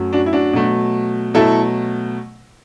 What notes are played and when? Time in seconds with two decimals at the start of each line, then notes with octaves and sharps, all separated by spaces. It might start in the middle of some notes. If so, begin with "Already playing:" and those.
Already playing: F#2 F#3 A3
0.13 D4 F#4
0.26 E4
0.33 D4 F#4
0.53 B2 F#3 A3
1.34 B2 F#3 A3 E4 A4